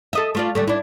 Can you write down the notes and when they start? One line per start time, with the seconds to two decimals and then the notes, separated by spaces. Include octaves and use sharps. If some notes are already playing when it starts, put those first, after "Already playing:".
0.13 A4 D#5 E5
0.35 A3 F4 D5
0.55 D3 G3 A3
0.67 D4 E4